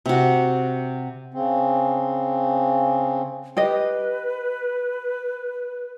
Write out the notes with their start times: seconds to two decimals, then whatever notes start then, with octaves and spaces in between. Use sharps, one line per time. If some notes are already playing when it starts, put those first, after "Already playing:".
0.06 C3 F#4
1.34 C#3 C4
3.57 G4 B4 D#5